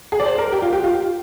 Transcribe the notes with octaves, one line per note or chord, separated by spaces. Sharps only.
G#4
D5
C5
A#4
G4
F4
G4
F4